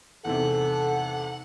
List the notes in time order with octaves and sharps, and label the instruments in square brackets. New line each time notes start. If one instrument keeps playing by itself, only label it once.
[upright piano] E2 G#2 C3 [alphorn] A4 [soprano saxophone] F#5